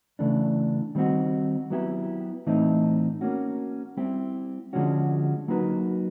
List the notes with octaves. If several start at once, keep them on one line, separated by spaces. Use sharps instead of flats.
C#3 E3 A3 D4
D#3 G3 C4 D#4 F#4
F#3 B3 E4 G4
A2 E3 A3 C4 D#4
A#3 C#4 F#4
G3 C4 E4 G4
D3 F3 G#3 C#4 F#4
F#3 A#3 D#4 F#4 B4